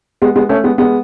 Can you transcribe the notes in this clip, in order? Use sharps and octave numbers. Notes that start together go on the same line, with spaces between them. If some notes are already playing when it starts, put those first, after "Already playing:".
G#3 B3
G#3 B3
A3 C#4
G#3 B3
G#3 B3